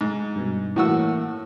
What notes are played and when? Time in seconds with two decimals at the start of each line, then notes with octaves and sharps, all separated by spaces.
0.01 G#2
0.36 G2 B2
0.76 A2 E3 A#3 F#4 C#6 E6